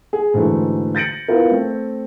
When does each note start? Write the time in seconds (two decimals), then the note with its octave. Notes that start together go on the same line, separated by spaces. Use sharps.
0.13 G#4
0.34 G#2 D3 E3 F#3 A3
0.95 G6 A6 A#6 C#7 D7 F#7
1.28 B3 E4 F4 A#4
1.51 A3 C4